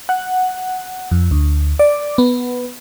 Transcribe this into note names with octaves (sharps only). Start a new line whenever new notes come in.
F#5
F2
D2
D5
B3